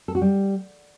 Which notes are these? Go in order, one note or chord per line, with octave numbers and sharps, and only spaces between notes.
A4
F#4
G3